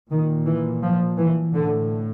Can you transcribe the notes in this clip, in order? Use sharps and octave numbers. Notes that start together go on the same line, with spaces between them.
A#2 D#3
E3
F3
E3
A2 D3